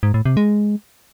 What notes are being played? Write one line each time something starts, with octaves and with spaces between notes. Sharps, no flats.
G#2
A2
C3
G#3